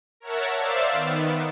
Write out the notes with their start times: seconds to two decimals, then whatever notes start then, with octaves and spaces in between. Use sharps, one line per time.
0.20 A#4 C#5 E5 F#5 A5
0.57 C5 D5 E5 F5 E6 A6
0.92 D#3 B3